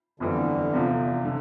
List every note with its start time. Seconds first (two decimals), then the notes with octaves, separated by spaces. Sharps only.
0.20 G1 F2 D3 E3 G3
0.72 F1 E2 C3 F3
1.25 D3